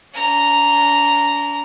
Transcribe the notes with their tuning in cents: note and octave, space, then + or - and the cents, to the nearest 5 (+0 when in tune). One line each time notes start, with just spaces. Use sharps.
D4 -40 A#5 -5